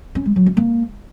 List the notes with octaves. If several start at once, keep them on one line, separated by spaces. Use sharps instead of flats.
C#4
G#3
F#3
C#4
A#3